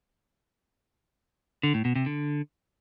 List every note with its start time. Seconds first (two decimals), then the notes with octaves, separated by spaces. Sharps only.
1.63 D3
1.74 A2
1.85 B2
1.96 C3
2.06 D3